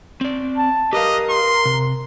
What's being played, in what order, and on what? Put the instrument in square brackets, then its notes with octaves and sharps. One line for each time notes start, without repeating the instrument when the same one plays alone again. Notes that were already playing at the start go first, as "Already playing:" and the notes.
[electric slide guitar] C4 D5
[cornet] A5
[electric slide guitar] G4 B4 F5 [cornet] A#4 [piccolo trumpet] D#5
[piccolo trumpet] C6
[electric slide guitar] C3